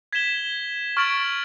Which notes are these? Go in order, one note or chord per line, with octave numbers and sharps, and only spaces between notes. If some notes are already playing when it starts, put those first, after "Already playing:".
G#6 B6 E7 G7
C#6 F6 A6 D7 F#7